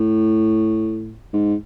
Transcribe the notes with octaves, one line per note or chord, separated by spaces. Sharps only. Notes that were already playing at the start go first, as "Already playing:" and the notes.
Already playing: A2
G#2